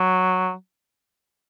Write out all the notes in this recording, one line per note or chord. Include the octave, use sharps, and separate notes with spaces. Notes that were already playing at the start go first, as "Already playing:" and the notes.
Already playing: F#3